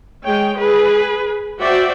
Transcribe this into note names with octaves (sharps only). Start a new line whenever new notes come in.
G#3 C#5 G5
G#4 B4
F#4 C5 D5 E5 G5